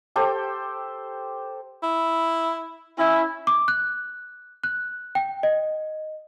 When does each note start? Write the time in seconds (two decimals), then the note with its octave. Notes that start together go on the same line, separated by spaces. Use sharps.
0.16 G4 A4 C5 G5
1.83 E4
2.98 C#4 E4
3.47 D6
3.68 F#6
4.64 F#6
5.15 G5
5.43 D#5